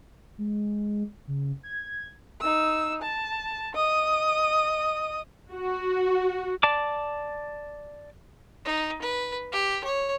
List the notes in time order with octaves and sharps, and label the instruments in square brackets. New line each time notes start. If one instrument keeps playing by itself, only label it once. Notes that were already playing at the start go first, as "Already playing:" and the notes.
[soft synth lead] G#3
C#3
G#6
[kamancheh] D#4 E6
A5
D#5 D#6
[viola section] F#4
[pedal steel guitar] D5 A5 D6
[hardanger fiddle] D#4
B4
G4
C#5